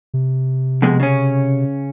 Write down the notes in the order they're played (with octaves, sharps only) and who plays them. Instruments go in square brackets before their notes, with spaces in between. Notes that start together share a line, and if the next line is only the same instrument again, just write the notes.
[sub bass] C3
[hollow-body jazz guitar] F2 B2 G#3
C#3 C#4